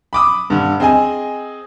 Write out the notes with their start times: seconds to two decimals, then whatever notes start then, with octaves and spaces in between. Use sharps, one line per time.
0.13 B5 D6 D#6
0.50 G2 D3
0.80 C4 G#4 D#5 G#5